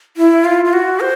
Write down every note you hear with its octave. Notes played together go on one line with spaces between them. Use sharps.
E4
F4
F4
F#4
C5